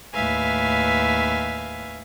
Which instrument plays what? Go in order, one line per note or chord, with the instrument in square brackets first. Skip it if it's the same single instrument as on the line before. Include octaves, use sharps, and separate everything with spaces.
[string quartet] D#2 A2 B4 E5 F5 G#5